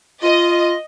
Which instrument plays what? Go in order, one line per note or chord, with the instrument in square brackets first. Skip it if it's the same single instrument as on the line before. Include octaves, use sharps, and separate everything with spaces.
[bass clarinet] F4 [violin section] D#5